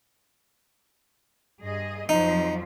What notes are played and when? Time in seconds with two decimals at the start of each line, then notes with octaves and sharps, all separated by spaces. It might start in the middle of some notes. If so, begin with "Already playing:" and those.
1.62 G2 G#4 D#5
2.09 F2 F3 F#3 D#4